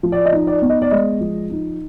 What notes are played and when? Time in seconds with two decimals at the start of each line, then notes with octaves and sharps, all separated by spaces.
0.03 F3
0.12 D5
0.26 D#5
0.32 D#4
0.47 D5
0.62 B3
0.70 D#5
0.82 D5
0.91 G#3 D#5
1.21 F3
1.50 D#4